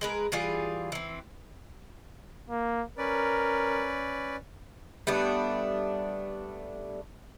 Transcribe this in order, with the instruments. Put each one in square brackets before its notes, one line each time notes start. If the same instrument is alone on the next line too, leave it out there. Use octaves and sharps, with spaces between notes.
[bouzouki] G#3 A#4 B4
E3 G3 F4 G#4
E3 C4
[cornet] A#3
[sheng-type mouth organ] C#4 B4 D5 [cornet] A#4
[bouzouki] G3 A3 B3 D4